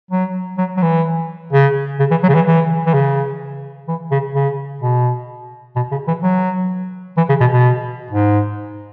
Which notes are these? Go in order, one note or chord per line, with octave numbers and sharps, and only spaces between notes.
F#3
F#3
F#3
E3
C#3
C#3
E3
F#3
C#3
E3
E3
E3
C#3
E3
C#3
C#3
B2
B2
C#3
E3
F#3
E3
C#3
B2
B2
G#2